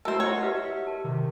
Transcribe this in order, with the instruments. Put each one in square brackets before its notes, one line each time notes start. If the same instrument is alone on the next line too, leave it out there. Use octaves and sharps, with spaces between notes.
[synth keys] A3 A#4 [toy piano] E4 F#4 E5 [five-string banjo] A4 C5
[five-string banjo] C#5 [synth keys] D#5 F#5
[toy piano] G4 B4 [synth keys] E5
[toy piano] A#4 A5
[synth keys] C3 D#3